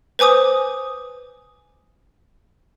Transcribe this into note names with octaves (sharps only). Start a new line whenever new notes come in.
B4 C5 G#5 D6 D#6